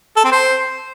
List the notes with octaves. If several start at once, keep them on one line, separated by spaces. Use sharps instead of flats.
A4
C4
C5